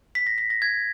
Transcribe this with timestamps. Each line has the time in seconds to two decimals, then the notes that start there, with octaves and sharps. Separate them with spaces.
0.15 B6
0.27 A#6
0.38 B6
0.50 A#6
0.62 G#6